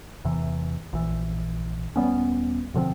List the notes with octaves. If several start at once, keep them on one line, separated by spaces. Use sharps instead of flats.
E2 C3 E3
A#1 E3
D#1 G3 B3 C#4
B2 D3 F3 C4